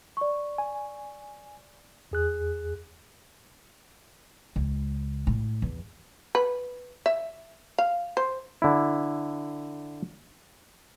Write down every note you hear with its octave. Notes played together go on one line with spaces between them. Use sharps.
D5 C#6
G#5
E2 G#4 F#6
C#2
A2
E2
B4
E5
F5
C5
D3 E4